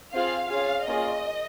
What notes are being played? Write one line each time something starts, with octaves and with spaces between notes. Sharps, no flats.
C4 F4 G#4 F5
C#4 F4 G#4 F5
A#3 C#4 F4 G#4 D#5